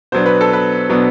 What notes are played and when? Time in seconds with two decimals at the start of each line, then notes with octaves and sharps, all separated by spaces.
0.12 B2 F#3 B3 D4 C5
0.26 B4
0.41 A4
0.53 B4
0.89 B2 F#3 B3 D4